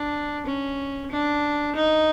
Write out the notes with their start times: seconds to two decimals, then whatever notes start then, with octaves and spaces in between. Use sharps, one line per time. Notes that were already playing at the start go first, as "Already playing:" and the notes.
Already playing: D4
0.46 C#4
1.11 D4
1.75 D#4